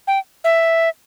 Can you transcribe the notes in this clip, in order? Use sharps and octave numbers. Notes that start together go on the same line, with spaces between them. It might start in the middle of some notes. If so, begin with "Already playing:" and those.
G5
E5